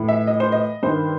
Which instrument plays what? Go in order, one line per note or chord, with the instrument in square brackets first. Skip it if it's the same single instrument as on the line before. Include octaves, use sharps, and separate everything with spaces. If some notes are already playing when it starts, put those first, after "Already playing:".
Already playing: [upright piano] A2 E3
E5
D#5
C5
D#5
G2 D#3 C5